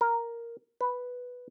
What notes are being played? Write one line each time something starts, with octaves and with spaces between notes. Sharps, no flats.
A#4
B4